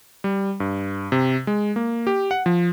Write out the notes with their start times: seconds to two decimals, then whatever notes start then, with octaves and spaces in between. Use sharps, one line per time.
0.24 G3
0.60 G2
1.12 C3
1.47 G#3
1.76 A#3
2.07 G4
2.31 F#5
2.46 F3